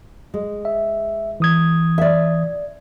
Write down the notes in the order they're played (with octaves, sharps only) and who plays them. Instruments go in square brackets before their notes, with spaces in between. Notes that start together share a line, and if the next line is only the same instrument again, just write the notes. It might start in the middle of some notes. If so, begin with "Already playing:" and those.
[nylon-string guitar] G#3
[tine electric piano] E5
E3 D#6 G#6
[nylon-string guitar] D5 E5